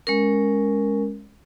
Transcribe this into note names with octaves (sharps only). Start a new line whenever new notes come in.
G#3 C#4 A#4